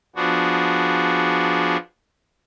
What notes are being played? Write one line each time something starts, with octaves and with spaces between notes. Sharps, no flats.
F3 B3 D4 F#4 G#4